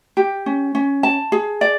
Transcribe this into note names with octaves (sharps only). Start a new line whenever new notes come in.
G4
C#4
C#4
A5
G#4
D5